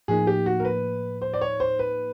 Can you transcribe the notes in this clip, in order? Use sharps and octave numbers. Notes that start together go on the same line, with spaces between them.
A2 F3 A#3 D#4 G#4
G4
F#4
A#4
B4
C5
D5
C#5
C5
B4